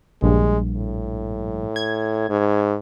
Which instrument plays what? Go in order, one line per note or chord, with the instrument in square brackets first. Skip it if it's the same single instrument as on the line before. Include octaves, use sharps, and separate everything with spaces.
[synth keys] A#1 G2 [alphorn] G#3
[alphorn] A2
[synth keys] G#6
[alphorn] G#2